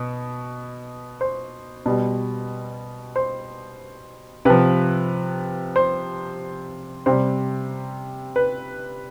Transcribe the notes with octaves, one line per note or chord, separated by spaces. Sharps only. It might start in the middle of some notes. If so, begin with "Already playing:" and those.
Already playing: B2
C5
B2 G3
C5
C3 F3 B4
C5
C3 G3 C5
B4